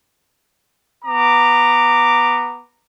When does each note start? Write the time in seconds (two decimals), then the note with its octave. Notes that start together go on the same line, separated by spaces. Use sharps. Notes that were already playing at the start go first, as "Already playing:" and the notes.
1.04 B3 A#5 D6